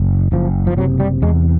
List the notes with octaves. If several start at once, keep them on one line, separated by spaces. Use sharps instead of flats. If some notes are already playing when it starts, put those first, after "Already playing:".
Already playing: F#1
F#1 F3
F3
C3 F#3
G3
E2 G#3